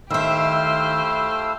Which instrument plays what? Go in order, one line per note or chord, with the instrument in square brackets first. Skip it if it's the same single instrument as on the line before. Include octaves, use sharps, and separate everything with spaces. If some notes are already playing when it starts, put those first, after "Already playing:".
[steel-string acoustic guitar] D#3 E5 [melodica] A3 E4 F5 [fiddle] G4 C5 [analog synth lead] E6